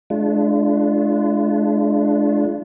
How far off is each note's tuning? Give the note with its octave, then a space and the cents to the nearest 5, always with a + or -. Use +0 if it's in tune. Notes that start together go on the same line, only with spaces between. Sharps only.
G#3 +35 D4 +0 F4 -35